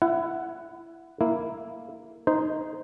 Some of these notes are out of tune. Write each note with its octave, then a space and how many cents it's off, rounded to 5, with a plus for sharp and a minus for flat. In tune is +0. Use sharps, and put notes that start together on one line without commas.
E4 +20 F#5 +0
A#3 +0 E4 +0
D#4 +0 C5 -15